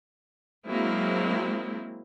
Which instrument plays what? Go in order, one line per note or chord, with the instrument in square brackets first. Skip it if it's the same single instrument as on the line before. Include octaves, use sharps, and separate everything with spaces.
[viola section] F#3 G#3 A#3 C4 E4